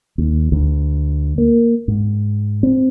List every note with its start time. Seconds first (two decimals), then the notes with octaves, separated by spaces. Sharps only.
0.18 D#2
0.52 D2
1.38 A#3
1.88 G#2
2.63 C4